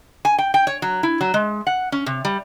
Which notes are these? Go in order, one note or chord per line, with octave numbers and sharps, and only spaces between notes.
G#5
G5
G5
C#5
F#3
E4
F#3
G#3
F#5
C#4
C3
G3